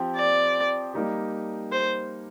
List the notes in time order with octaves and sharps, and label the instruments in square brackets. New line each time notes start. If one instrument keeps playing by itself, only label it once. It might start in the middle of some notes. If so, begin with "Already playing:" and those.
Already playing: [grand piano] F3 C4 G4
[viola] D5
[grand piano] G3 A#3 D#4 G4
[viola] C5